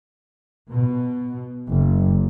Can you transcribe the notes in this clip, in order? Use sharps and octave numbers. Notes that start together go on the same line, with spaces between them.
B2
F#1